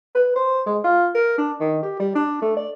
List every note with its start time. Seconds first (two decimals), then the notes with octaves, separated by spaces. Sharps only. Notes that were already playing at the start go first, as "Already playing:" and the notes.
0.15 B4
0.36 C5
0.66 G#3
0.84 F4
1.15 A#4
1.38 D4
1.60 D#3
1.83 G4
2.00 G3
2.15 D4
2.42 A3
2.57 D5